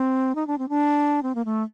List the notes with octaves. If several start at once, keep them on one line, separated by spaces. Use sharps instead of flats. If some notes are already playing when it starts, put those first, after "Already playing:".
Already playing: C4
D#4
D4
C4
D4
C4
A#3
A3